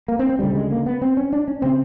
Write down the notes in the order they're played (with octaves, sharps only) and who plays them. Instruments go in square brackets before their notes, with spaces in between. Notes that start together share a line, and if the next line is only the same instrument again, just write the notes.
[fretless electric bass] A#3
C4
C4
D2 C#3 G3
G#3
A#3
B3
C4
C#4
D4
C#4
C#3 C4